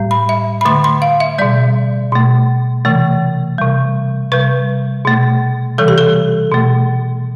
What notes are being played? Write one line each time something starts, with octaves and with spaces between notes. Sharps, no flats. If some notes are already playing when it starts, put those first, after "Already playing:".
Already playing: A2 G3
B5
E5
B5
D3 A3 C6
C6
F5
E5
B2 G3 D5
B2 A3
C3 E3 A3
C3 G3
C3 G3 B4
B2 A3
C3 E3 G3 A4
G4
A4
B2 A3